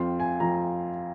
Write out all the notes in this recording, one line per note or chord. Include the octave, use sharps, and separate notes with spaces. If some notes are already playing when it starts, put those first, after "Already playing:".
Already playing: F2 F3 C4 F4 C6
G#5
F2 F3 C4 F4 A#5